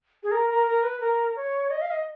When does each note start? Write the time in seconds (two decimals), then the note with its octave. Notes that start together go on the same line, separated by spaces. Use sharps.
0.23 G#4
0.32 A#4
0.50 A#4
0.67 A#4
0.83 B4
1.01 A#4
1.36 C#5
1.70 D#5
1.82 F5
1.91 D#5